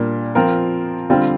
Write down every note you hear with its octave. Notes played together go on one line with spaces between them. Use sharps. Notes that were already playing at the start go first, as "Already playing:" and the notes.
Already playing: A#2 G3 A#3 D4
F3 C4 F4 A#4
D3 G3 C4 F4